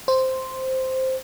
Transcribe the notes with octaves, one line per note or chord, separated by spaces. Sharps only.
C5